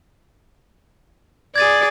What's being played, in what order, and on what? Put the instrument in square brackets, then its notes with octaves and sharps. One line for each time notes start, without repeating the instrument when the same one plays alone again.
[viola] G#4 D5 [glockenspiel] G#6 A6 D#7